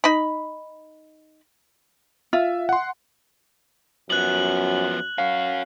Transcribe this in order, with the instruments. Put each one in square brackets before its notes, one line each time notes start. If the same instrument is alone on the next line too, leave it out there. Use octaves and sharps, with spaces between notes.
[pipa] D#4 B5
[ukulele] F4 [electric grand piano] E5
[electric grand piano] F#5 C6
[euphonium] F#2 [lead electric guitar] F3 B3 [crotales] F#6 F#7
[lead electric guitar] C#4 F#4 [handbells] F5